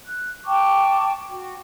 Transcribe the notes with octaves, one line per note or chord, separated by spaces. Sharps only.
F#6
G5 A5 C#6 D6
F#4